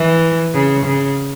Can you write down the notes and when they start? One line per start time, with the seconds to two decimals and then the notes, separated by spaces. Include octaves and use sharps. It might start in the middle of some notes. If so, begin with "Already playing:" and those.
Already playing: E3
0.54 C#3
0.86 C#3